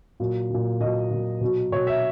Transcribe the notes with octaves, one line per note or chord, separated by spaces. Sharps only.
A#2 F#3
A#2 F#3
A#2 F#3 D#5
A#2 F#3
B2 F#3
B2 F#3 C#5
E5